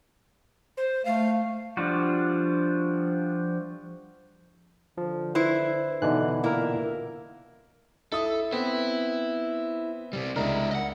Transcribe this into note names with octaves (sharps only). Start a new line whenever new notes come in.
C5
A3 F5
F3 G3 D4 F4 F#4
D3 F3
E4 B4 C5
B2 D3 E3 D#4 F#6
A#2 A#3 E4 A#4
E4 A4 D#6
B3 C4 E4
C3 G3
C#2 D4 E4 A#4
D#5 F#5